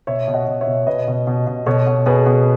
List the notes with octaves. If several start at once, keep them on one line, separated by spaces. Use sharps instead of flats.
B2 C#5 E5
B2
D#5 F#5
B2
C#5 E5
B2
B2 B4 D#5
B2
B2
B2
B2 A4 C#5
B2
B2 G#4 B4
B2